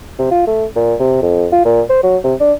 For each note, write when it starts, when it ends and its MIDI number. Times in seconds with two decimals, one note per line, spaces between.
0.19 0.27 48
0.31 0.45 65
0.47 0.65 57
0.75 0.94 46
1.00 1.19 48
1.22 1.47 41
1.53 1.64 65
1.65 1.81 46
1.89 2.02 72
2.03 2.17 54
2.24 2.34 48
2.40 2.53 62